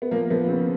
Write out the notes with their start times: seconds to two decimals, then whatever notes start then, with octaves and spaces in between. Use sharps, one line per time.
0.02 B3
0.11 F3 A#3
0.30 F3 B3
0.48 C#3 C4